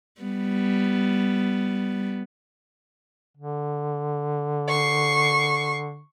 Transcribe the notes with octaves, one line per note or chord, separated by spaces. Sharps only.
G3 B3
D3
C#6 C7